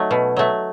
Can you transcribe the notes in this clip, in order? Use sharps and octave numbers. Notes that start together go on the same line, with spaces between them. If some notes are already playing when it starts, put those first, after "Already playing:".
Already playing: F#3 A3 D#4
B2
F#3 A3